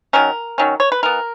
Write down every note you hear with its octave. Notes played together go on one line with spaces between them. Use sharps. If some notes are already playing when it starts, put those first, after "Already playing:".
D#3 F#3 C#4 A#4
D#3 F#3 C#4
C#5
B4
E3 B3 A#4